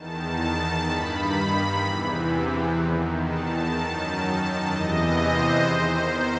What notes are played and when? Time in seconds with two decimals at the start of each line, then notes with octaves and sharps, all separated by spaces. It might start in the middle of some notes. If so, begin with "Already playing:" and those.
Already playing: E2 D#3 A5
0.38 A5
0.86 G2 D#3 B5
1.82 E2 C3 E3
2.77 E2 D#3
3.25 A5
3.73 F#2 D#3
4.69 E2 C3 E3 D#5
5.17 C5
5.64 E2 D#3